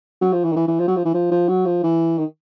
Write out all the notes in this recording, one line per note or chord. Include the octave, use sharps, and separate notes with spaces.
F#3
F3
E3
D#3
E3
E3
F3
F#3
F3
E3
F3
F3
F#3
F3
E3
D#3